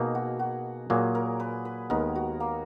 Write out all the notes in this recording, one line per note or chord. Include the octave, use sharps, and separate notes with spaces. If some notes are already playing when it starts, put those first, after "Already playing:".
Already playing: B2 A#3 D#4 G#4 A#4
F#4
F#4
A#2 F#3 A#3 G#4
A#4
B4
B4
D#2 D#3 G#3 B3 A#4
F#4
A#3